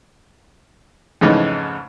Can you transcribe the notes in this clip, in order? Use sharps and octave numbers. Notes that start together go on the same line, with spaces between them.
F2 G#2 C#3 E3 A3 D#4